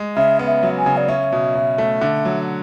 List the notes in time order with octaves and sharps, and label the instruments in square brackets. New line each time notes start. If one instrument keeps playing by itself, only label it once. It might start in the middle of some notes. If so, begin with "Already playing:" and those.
Already playing: [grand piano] G#3
[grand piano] C#3 [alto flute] E5
[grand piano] B3
[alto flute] E5
[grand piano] F#3
[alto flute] G#5
[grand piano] C#3
[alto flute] D5
[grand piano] C#4 [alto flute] E5
[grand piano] B2
B2
A3
D3
F#3